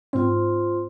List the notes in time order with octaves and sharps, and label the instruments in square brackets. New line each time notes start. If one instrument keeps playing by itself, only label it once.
[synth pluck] G#2 C4 [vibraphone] F4 C5 C6